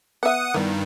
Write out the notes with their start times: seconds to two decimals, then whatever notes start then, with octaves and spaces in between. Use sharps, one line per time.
0.23 B3 E5 F#5 D#6
0.54 G2 D#3 E3 B3